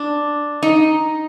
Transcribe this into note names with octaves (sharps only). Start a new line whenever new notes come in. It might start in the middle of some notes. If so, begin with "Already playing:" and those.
Already playing: D4
D#4